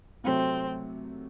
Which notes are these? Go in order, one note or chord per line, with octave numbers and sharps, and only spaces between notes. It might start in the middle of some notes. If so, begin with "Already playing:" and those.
C3 F#3 A3 C4